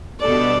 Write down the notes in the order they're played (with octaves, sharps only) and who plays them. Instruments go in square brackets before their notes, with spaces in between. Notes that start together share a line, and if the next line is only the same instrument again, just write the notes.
[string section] B2 G3 D4 A4 [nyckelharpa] D5